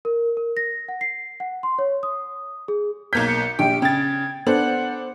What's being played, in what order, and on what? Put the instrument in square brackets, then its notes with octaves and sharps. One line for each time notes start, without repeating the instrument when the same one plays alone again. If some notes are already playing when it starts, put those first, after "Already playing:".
[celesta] A#4
A#4
A#6
F#5
C7
F#5
C6
C#5
D#6
G#4
[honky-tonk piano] B1 A#3 G6 [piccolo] G#6 [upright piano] B6
[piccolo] C#7
[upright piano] A#1 [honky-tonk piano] G4 [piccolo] D7
[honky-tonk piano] C#3 A6 [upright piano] G5 [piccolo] G#6
[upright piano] B3 A4 C5 [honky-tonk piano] D4 [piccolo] F#5